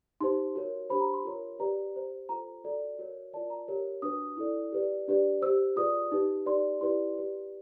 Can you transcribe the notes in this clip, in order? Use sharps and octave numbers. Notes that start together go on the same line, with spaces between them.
D#4 G4 C5 C6
F#4 A#4 C#5
D4 G4 C5 B5
A#5
C6
F4 A#4 C#5
G4 B4 D5 A#5
G4 C5
F4 A4 C5 A#5
F#4 A4 D5
F#4 A#4 C#5
F4 A#4 D5 A5
A#5
G4 A#4 C#5
D4 F#4 B4 D#6
E4 A4 D5
G4 B4 D5
D4 G4 B4 D5
G4 C5 E6
F4 G#4 B4 D5 D#6
D#4 G4 B4
D#4 G4 B4 D5 C6
E4 G4 B4 D5 C6
G4 B4 D5